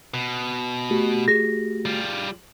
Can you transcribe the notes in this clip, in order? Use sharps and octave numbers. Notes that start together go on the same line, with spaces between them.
B2
A3 F#4 G4
G#4 A#6
G3 F4